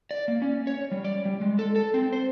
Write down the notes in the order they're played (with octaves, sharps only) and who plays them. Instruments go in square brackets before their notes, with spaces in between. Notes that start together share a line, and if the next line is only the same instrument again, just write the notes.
[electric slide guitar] D5
A#3
C#4
C#5
G3
D5
G3
G#3
A4
A4
C4
C5